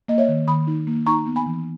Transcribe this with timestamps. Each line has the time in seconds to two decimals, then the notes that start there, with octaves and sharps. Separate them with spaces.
0.08 A#3 D#5
0.18 C#5 E5
0.28 D#3
0.48 D#3 B5 D#6
0.67 D#4
0.87 A#3
1.06 D#4 A#5 C#6
1.26 B3
1.36 G#5 B5
1.46 E3